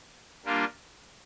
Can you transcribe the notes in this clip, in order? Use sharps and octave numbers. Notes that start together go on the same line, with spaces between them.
G3 A#3 D4 F4